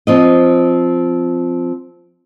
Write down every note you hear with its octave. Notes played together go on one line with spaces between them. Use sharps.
F3 C4 D#5